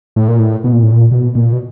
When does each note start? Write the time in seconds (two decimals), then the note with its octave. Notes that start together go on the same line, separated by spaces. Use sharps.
0.16 A2
0.28 A#2
0.39 A2
0.64 B2
0.72 A#2
0.82 A2
0.92 A#2
1.11 B2
1.35 A#2
1.53 B2